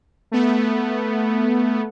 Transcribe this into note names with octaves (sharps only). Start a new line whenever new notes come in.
A3 B3